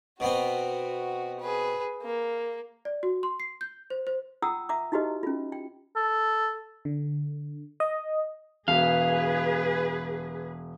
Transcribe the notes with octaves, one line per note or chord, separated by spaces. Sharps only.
B2 B3 C4 F#4
G#4 B4
A#3
D5
F#4
C6
C7
G6
C5
C5
F4 F#5 G5 A#5 D#6 E6
E5 A#5 D6
D#4 E4 F#4 G4 B4 D#5
C#4 F4
G5
A4
D3
D#5
E1 G#4 B4 F5